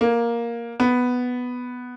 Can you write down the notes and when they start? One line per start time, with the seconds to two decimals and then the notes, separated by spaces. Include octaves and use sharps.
0.01 A#3
0.80 B3